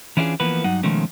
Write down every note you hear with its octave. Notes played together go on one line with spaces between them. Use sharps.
E3 C#4 D4 E4 F4 G#4
E3 F3 A#3 B3 B4
G2 F#3 D#4 F#5
B2 D#3 F3 G#3 A3 C#4